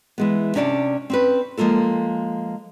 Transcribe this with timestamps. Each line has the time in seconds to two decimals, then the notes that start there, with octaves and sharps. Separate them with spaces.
0.18 E3 G#3 B3
0.55 C3 C#4 D4 D5 F5 A5
1.10 C4 C#4 B4
1.57 F3 G#3 A#3 F4 A4